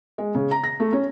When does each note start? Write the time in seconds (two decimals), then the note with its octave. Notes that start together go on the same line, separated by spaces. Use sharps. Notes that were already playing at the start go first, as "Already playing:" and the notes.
0.18 G#3
0.35 C#3
0.51 A#5
0.64 A#6
0.80 A3
0.93 C#4